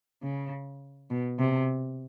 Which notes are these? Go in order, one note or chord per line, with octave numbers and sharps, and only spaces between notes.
C#3
B2
C3